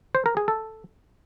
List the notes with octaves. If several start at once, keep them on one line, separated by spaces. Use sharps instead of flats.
C5
A#4
G#4
A4